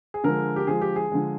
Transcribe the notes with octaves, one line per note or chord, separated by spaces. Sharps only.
G#4
D3 F3 G#3 A#4
G4
D3 F3 G#3 G#4
G4
G#4
D3 F3 G#3